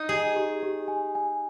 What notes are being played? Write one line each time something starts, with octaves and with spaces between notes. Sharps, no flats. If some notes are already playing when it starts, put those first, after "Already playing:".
Already playing: D#4 D#5
G4 G#4
G4
G4
G#5
G#5